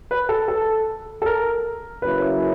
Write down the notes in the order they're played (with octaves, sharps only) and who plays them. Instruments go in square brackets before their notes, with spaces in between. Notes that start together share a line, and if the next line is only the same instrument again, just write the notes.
[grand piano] B4
A4
A4
A4
A#4
[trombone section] C#3 F#3 A#3 C#4 E4 [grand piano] B4